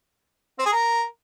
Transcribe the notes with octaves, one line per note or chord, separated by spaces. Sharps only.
C4
G#4
A#4